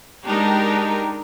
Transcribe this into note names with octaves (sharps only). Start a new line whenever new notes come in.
G#3 D4 D#4 G4 A#4